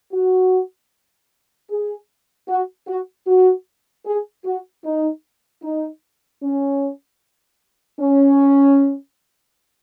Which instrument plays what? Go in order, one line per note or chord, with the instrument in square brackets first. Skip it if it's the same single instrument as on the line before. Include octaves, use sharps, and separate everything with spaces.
[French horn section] F#4
G#4
F#4
F#4
F#4
G#4
F#4
D#4
D#4
C#4
C#4